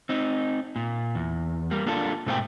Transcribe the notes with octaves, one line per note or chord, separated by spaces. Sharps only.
C4 D#4
A#2
E2
G3 A#3
A#3 D4 F4 A4
G#2 B2 A3 A#3 C5 G5